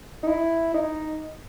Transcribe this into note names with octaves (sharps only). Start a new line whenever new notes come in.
D#4
E4
D#4